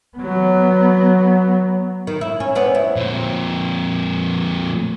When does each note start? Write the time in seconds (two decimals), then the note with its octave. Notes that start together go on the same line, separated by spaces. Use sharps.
0.17 F#3 B3
2.07 D#3
2.21 E4
2.40 C#4
2.55 B3 C4 D4
2.75 E4
2.96 F2 A#2